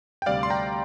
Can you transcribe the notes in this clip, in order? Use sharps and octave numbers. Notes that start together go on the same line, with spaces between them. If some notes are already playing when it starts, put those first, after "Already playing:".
G5
D2 C3 G3 D5 F5
C6
G5 A#5